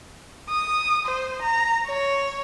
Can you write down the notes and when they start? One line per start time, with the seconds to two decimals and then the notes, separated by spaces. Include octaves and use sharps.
0.49 D#6
1.07 C5
1.42 A#5
1.86 C#5